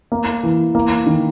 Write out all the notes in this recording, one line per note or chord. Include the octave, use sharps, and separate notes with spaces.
A#3
E3
A#3
D#3